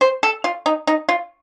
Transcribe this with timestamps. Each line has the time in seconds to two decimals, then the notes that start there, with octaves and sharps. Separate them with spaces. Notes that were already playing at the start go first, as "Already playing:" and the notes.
0.01 C5
0.23 A4
0.44 F4
0.66 D#4
0.87 D#4
1.09 F4